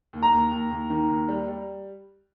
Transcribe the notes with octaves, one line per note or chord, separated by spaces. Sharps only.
D#2
A#5
D#2
D#2
D#2
D#3
D#2
G3
G3